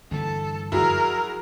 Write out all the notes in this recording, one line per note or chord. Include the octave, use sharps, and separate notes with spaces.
G1 D3 E3 A4
F#2 F3 E4 F#4 G#4 A#4